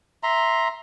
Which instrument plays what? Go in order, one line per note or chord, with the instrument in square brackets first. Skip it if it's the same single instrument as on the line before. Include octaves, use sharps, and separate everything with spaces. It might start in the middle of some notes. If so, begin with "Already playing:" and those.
[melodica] E5 A#5 C6